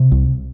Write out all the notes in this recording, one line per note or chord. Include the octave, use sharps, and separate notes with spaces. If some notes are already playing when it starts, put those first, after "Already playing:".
Already playing: C3
C2